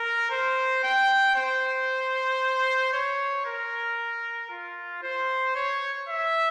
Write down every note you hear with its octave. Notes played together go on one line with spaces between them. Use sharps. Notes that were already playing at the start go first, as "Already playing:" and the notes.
Already playing: A#4
C5
G5
C5
C#5
A#4
F4
C5
C#5
E5